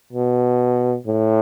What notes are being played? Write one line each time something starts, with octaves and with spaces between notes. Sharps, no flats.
B2
A2